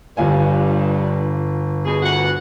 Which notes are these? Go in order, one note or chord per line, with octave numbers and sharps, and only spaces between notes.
G1 G2 F4 G#5
B2 G#4
D2 E3 F#5